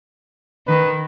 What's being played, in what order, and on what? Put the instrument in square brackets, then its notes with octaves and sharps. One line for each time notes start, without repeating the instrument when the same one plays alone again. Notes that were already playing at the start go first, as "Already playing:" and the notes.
[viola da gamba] D#3 [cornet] B4